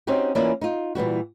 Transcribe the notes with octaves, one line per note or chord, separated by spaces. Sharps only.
C4 C#4 D#4 F#4 G4
E3 A#3 C#4 E4 F4 D5
D#4 F4
A#2 E3 G3 F#4